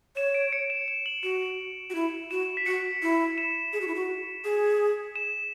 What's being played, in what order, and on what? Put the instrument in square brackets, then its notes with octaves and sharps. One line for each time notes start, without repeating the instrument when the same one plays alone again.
[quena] C#5 [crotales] E7
[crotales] D7
C#7
E7
E7
F#7
[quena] F#4 [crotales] E7
[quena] F#4
E4
[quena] F#4 [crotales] E7
[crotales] B6
[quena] F#4 [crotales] C#7
[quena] E4
[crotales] E7
[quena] G#4
F#4
E4
F#4
G#4
[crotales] E7